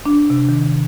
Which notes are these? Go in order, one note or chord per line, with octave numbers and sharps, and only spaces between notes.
D4
C3
D#3